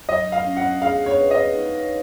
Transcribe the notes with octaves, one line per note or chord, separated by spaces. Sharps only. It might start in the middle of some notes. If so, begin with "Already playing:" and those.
F#3 D#5
F5
C#4
F#5
G#4 F5
C#5
B4
D#5
D#4